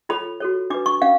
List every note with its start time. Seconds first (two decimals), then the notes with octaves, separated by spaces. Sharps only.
0.09 F4 A4 C#5 B5
0.40 F#4 A4 C#5
0.70 D4 F#4 B4 D6
0.86 C#6
1.01 C#4 F5